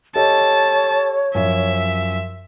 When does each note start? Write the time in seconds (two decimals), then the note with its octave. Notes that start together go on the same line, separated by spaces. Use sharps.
0.16 G4 A4 C#5 D#5 A5
1.35 F#2 F3 E5